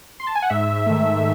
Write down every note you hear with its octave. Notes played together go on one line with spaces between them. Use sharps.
C6
A5
G#5
F#5
G#2 E5
D#3 A3